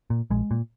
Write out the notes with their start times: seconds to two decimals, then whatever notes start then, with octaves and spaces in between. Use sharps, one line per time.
0.10 A#2
0.30 A#1 G#3
0.51 A#2